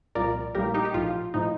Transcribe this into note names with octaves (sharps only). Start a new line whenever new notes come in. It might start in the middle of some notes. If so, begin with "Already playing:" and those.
C2 A#2 F3 A#4 D5
A#1 A2 G3 A#3 G4 A#4
D#4 G4
G4
A#1 A2 F3 F4
A2 F3 D#4